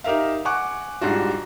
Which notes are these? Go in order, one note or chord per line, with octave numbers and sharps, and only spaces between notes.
D#4 G4 A#4 E5 F5
F#5 G#5 C#6 D6 F#6
G#2 G3 D4 F4 F#4